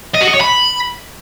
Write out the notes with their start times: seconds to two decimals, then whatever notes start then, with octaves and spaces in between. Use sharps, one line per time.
0.14 D#5
0.21 F#4
0.27 D#5
0.34 C#5
0.41 B5